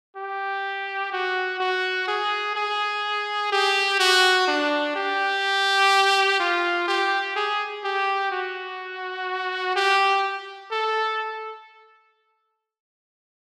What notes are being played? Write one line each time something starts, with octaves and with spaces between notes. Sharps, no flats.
G4
F#4
F#4
G#4
G#4
G4
F#4
D4
G4
F4
G4
G#4
G4
F#4
G4
A4